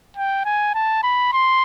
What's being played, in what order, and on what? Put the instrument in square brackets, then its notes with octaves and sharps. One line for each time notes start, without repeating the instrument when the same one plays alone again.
[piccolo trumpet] G5
G#5
A5
B5
C6